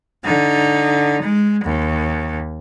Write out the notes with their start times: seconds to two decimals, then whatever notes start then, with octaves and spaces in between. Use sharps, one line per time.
0.24 D3 D#4
1.22 G#3
1.64 D#2